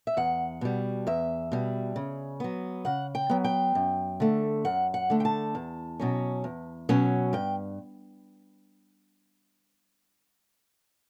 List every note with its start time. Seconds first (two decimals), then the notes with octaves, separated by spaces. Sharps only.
0.07 E5
0.17 E2 F#5
0.61 B2 G3
1.07 E2 E5
1.52 B2 G3
1.96 C#3
2.40 F#3 B3
2.85 C#3 F#5
3.15 G5
3.30 F#3 B3
3.44 G5
3.75 F#2
4.20 D3 A3
4.65 F#2 F#5
4.94 F#5
5.10 D3 A3
5.20 G5
5.25 A5
5.55 E2
6.00 B2 F#3 C#4
6.44 E2
6.89 B2 F#3 C#4
7.33 G2 G5